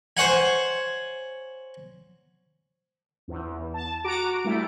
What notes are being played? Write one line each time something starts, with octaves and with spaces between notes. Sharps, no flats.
C5 C#5 F#5 G#5
E2
A5
F#4 A#5 D6 D7
G3 A3 E4